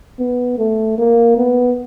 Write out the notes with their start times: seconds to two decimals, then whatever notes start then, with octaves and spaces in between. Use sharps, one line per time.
0.19 B3
0.58 A3
0.98 A#3
1.37 B3